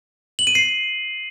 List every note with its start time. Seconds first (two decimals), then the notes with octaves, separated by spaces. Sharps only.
0.39 F#7
0.47 D#7
0.55 C7